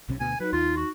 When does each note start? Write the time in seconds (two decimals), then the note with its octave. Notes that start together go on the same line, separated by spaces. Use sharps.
0.09 B1 C3 C#4
0.20 D2 B2 B3 G#5
0.40 F#3 D#4 B4
0.53 D#2 F4
0.77 F#4